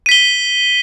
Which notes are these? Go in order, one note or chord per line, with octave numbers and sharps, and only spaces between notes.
B6 D#7 G7